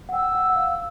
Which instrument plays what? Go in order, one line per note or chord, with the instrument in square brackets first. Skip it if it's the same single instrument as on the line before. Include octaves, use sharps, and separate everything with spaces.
[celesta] F#5
[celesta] G5 [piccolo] E6
[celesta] F#5
F#5
F5